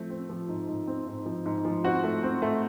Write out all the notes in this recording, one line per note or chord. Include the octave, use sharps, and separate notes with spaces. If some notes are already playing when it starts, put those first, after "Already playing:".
Already playing: F3 A3 C4
C4
F3
G#2
G#2
C4
G#2
F3
G#2
F3
C4 F#4
A3
C4
A3